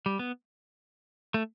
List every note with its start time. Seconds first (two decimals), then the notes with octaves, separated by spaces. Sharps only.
0.06 G3
0.19 B3
1.34 A3